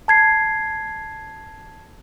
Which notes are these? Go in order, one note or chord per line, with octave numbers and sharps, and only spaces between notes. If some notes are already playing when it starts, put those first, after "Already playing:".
A5 G#6 C7